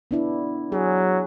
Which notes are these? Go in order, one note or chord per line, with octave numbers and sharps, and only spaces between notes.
B3 D4 E4
F#3 G#4